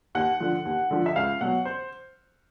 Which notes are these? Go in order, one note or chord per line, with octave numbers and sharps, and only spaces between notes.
D#2 F#5
D3 F3
D#2
D3 F3
E5
C#2 F5
B2 F#3 F#5
C5